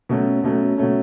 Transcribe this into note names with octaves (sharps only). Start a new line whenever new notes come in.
B2 F#3 A3 C#4
B2 F#3 A3 C#4
B2 F#3 A3 C#4